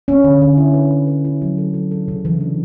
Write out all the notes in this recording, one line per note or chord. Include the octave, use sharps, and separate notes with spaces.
C#4
D3
D3
E4
B4
E4
B4
E4
F#3
A4
F#3
A4
C#3
E3
D4